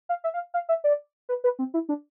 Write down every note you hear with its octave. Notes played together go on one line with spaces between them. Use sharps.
F5
E5
F5
F5
E5
D5
B4
B4
C4
E4
D4